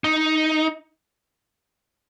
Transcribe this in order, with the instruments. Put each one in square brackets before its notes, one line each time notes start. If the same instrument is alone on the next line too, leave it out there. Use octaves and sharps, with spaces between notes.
[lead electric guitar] D#4